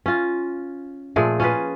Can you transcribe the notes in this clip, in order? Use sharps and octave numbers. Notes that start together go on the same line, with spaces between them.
C#4 F4
A#2 F3 A3 G#4
C#4 F4 G#4 B4